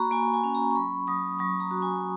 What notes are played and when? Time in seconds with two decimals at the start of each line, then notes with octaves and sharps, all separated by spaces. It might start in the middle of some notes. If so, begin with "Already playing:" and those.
Already playing: A#3 F#4 A#5 B5 C#6
0.11 A#3 G#5
0.34 G#5
0.44 C#4
0.55 A#5
0.71 C#6
0.76 F#3 B5
1.07 F#3 D#6
1.39 F#3 C#6
1.60 A#5
1.71 F#4
1.82 G#5